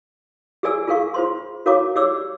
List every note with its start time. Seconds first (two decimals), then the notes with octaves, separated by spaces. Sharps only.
0.63 G4 G#4 A#4 D5 G#5 E6
0.88 F4 G#4 A#4 F5 C#6
1.14 F4 C5 C6
1.66 F#4 A#4 C#5 F5 A#5 D6
1.96 G4 C#5 D5 D6 E6